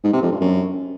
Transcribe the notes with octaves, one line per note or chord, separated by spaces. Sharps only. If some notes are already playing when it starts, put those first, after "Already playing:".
G#2
C3
F2
G2
F#2